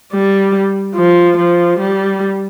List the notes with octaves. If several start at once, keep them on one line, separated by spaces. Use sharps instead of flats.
G3
F3
F3
G3